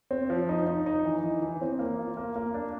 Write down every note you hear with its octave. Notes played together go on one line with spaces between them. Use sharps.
C4
F3
D#4
D#4
D#4
E3
E3
E3
C4
A#3
F4
A#3
A#3
D4